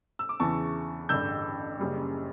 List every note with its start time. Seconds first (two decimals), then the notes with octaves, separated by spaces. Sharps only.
0.19 E6
0.29 D6
0.40 E2 C#3 E3 A5 C#6
1.09 A1 G2 D3 E6 G6
1.79 F#1 F#2 C#3 G3